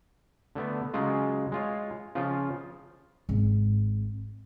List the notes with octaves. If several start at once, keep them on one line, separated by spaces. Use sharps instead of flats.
D3 A3 B3
C#3 F#3 G#3 F4
G#3 F4 C#5
C#3 F3 F4
G#1